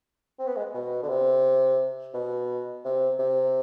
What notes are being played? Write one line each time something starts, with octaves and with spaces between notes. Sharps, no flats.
C4
B3
G#3
B2
D3
C3
B2
C3
C3